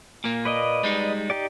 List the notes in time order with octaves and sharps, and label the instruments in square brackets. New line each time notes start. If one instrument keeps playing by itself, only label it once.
[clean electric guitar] A#2 A#3
[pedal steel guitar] B4 D5 D#5
[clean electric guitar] G3 G#3 D#4
[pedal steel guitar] D#4 G4 D5